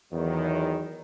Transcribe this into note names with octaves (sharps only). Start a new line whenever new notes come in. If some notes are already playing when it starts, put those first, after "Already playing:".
E2 D#3 F#3